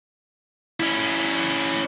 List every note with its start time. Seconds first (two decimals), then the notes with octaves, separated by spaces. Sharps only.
0.80 C#4 E4